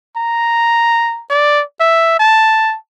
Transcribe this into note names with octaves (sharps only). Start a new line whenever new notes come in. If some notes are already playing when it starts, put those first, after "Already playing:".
A#5
D5
E5
A5